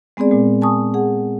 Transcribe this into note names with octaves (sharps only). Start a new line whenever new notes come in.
G#3 B3 C4 G#4 D5
A#2 G#3
G#5 A5 C#6 D#6
G#4 F#5